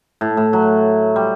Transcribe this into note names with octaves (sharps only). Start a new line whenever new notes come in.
A2
A2
F#3
G3